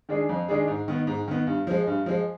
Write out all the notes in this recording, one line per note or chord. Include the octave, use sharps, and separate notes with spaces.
D#3 G#3 D4 G#4
F2
D#3 G#3 D4 G#4
G#2
D#3 B3
G#2
D#3 B3
G2
F3 G#3
G2
F3 G#3